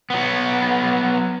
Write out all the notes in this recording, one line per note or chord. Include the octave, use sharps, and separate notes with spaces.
F#3 B3